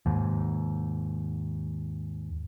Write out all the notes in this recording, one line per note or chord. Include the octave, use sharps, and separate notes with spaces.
D#2 G#2